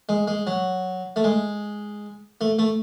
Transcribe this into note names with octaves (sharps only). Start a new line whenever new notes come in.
G#3
G#3
F#3
A3
G#3
A3
A3